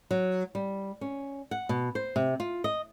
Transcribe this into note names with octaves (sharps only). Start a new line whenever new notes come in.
F#3
G3
C#4
F#5
B2
C5
C3
F4
D#5